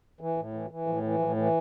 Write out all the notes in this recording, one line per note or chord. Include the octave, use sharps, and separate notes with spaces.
E3
A2
E3
E3
A2 F3
E3
A2 F3
E3